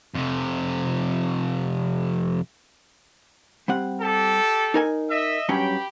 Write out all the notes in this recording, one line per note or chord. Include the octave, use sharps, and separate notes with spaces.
F2 C3
G3 C4 F#5
G4 A4
D#4 A#4 G#5
D#5 E5
G2 F#3 C#4 G4 G5 B5